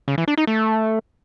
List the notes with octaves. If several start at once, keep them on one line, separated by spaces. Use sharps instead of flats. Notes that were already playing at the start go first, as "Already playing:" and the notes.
C#3
E3
D4
D#4
A3